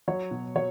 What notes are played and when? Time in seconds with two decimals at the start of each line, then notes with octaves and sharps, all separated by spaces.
0.08 F#3 C#5
0.31 B2
0.56 F#3 C#5